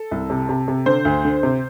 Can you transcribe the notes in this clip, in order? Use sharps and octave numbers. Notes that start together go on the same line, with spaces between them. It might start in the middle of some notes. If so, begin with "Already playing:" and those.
Already playing: A4
C2
C3
C3
C3
D3 C5
D2
D3
C3